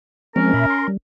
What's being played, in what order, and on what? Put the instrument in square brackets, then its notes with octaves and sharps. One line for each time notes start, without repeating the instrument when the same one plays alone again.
[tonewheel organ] F3 G#3 C4 [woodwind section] C#4 A#4
[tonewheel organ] A#2 E5 B5
C6
G3